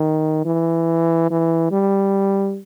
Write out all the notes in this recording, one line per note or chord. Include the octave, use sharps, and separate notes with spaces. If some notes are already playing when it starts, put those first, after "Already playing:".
Already playing: D#3
E3
E3
G3